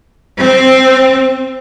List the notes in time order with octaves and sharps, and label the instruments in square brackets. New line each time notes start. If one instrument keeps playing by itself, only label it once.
[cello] C4